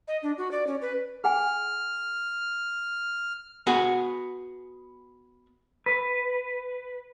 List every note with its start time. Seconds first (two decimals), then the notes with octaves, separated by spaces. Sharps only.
0.08 D#5
0.23 D4
0.38 F#4
0.51 D5
0.67 C#4
0.82 B4
1.24 G#4 F#5 G#5 F6
3.67 B3 F#4 G#4
5.86 B4